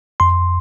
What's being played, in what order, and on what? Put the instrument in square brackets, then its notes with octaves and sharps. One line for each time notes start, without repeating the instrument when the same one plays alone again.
[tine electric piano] F2 C6